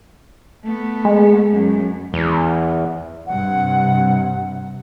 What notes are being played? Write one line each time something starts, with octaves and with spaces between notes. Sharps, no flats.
A3 B3
G#3
F#2
E2
G2 C3 F#5